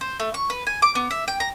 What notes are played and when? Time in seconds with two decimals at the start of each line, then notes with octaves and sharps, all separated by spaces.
0.01 C5
0.20 A3
0.34 C#6
0.50 B4
0.67 G#5
0.82 D6
0.95 B3
1.11 E5
1.28 G5
1.40 A#5